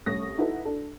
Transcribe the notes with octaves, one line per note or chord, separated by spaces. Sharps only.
C2 A3 C#4 C#6 D#6 A#6
D#4 E4 F#4 A4 B4
D4 A4